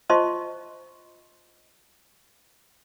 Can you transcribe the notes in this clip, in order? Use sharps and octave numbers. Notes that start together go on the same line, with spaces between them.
F4 C5 D#5 A5 C6 C#6